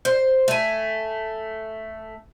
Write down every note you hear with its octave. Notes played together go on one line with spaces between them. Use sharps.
C5
A3 G#5